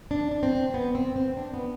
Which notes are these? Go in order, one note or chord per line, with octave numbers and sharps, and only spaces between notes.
D4
D4
C4
B3
C4
C4
D4
B3